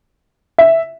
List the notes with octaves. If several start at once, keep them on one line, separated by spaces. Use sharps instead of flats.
E5